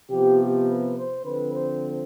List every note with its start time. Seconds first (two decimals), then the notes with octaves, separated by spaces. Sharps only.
0.10 C3 F3 B3 G4
0.39 G4
0.68 B4
0.97 C5
1.25 D3 F3 C4 B4
1.55 C5